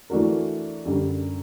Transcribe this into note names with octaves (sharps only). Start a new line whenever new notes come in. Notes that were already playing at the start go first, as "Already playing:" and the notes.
E3 A3 D4 F#4 A#4
F#2 D3 G3